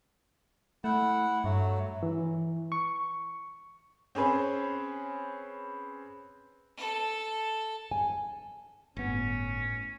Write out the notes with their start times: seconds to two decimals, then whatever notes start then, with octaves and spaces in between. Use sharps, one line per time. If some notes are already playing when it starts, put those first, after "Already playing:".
0.84 A3 E4 F#5
1.44 G2 F#3 A3
2.03 E3
2.72 C#6
4.15 C4 C#4 G#4 B4 C5
6.77 A4
7.91 G#5
8.96 G1 A2 B3 C#4